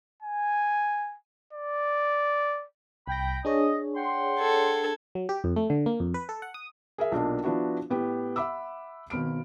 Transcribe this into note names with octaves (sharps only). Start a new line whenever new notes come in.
G#5
D5
C2 G5 B5 A#6
D4 G#4 C#5 D#5
F#5 G5 C6
A4 G#6
F#3
G4
F2
A3
D3
A#3
F2
B4
A4
F#5
D#6
G#4 A#4 E5
B1 A#2 D4 A#4 D#5
F3 B3 D4 E4 F#4
A2 B3 G4
E5 F#5 B5 D6 E6
G#1 B2 B5 F6 D7